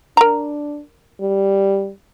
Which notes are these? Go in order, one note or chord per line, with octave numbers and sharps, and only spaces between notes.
D4 A#4 A#5
G3